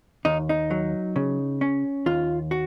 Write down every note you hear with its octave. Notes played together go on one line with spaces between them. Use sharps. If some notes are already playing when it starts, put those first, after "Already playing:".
D#2 D#4
D#4
F#3
C#3
C#4
D#2 F4
F#4